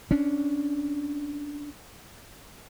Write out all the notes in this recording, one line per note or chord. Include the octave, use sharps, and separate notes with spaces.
C#4 D4